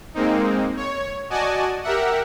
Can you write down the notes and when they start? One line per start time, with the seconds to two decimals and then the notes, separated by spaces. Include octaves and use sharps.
0.14 G#3 A#3 C4 D#4
0.77 C#5
1.30 F#4 D5 D#5 G#5 A5
1.83 G4 A#4 E5 F#5